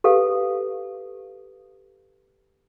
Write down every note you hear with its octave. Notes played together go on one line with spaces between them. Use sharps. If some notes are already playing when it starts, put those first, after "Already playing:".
G4 A4 B4 F5